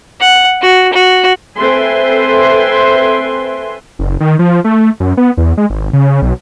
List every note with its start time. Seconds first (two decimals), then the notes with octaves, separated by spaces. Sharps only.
0.20 F#5
0.62 F#4
0.93 F#4
1.56 C4 A4 B4 E5 G#5 C6
3.99 F#1
4.20 D#3
4.39 F3
4.64 A3
5.00 F#2
5.17 B3
5.37 E2
5.57 G#3
5.70 G#1
5.93 C#3
6.22 B1